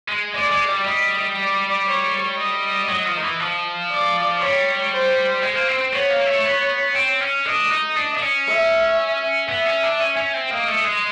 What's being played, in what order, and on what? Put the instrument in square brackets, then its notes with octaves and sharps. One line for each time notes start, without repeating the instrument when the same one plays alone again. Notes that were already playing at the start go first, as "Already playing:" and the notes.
[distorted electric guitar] G#3
[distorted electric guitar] G#3 [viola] D5
[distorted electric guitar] G#3
G3
[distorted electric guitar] G3 [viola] D#5
[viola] D5
C#5
D#5
[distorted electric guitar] F#3
F3
D#3
E3
F3
[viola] D5
[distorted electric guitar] G3 [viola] C#5
[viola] C5
[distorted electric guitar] G#3 [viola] C5
[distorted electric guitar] A#3
C4
C4
[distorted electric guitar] B3 [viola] C#5
[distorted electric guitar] A#3
A3
B3
C4
C#4
[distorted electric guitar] D4 [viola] D#5
[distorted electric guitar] D#4
D4
D4
C#4
[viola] E5
[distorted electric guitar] B3 [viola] E5
[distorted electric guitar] C#4
D4
C#4
C#4
C4
[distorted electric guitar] A#3 [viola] D#5
[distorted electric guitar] A3
G#3